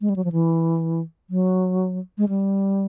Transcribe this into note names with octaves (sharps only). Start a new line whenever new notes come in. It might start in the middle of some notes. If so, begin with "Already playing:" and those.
G#3
G3
F#3
F3
E3
F#3
G#3
G3